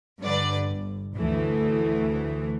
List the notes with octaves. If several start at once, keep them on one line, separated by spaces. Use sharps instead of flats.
G2 D3 B4 D5
G1
D2 E3 A3